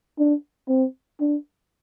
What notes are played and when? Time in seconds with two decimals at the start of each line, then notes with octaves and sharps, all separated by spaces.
0.19 D4
0.69 C4
1.21 D4